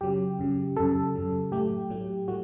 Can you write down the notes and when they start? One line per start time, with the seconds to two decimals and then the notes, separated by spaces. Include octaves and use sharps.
0.01 F#2 C#3 F#3 G4
0.39 F#2 C#3 F#3
0.76 F#2 C#3 F#3 A4
1.15 F#2 C#3 F#3
1.51 A2 F#3 A3 G4
1.90 A2 F#3 A3
2.28 A2 F#3 A3 F#4